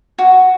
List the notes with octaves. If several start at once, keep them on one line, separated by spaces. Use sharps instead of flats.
F#4